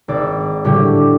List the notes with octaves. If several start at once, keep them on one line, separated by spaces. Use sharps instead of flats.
G#1 D5 E6
A2 D3 G3 G4